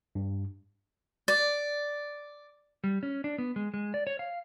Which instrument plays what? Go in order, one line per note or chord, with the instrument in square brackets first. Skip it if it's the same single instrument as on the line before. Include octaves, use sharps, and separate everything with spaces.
[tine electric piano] G2
[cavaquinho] D5
[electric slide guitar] G3
C#4
D4
B3
G#3
G#3
D5
C#5
F5